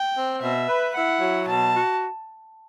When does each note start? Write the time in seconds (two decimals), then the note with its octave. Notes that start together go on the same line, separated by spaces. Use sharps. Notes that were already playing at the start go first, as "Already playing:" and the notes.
Already playing: G5
0.15 C4
0.42 B2 E5
0.68 B4
0.94 E4 F#5
1.20 F#3
1.47 B2 A5
1.73 F#4